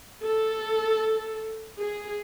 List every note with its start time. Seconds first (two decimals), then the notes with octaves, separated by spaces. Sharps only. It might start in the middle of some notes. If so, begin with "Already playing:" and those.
0.23 A4
1.78 G#4